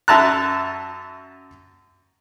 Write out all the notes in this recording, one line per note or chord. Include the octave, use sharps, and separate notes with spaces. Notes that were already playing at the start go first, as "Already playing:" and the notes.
F#2 E5 A5 A#5 F#6